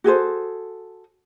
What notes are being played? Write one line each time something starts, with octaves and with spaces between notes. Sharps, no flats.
F#4 G#4 A4 C5